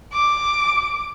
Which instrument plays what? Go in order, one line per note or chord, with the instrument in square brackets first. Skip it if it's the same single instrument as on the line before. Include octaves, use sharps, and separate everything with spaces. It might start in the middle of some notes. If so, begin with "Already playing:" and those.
[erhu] D6